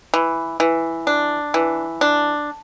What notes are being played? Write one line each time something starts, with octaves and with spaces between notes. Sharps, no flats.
E3
E3
D4
E3
D4